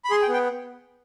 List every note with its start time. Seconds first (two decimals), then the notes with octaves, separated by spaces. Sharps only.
0.05 B5
0.10 G#4 C6
0.22 G5
0.28 B3
0.33 G5